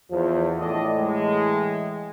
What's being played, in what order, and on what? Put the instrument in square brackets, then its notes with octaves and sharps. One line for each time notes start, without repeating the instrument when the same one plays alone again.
[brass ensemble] E2 [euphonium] F3
[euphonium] A2 [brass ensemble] D4 A4 D#5
[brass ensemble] E3 G#3